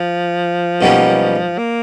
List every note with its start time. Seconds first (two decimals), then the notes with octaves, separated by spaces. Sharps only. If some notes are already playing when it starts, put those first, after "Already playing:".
Already playing: F3
0.81 B1 B2 G3 A#3 C#4
1.59 A#3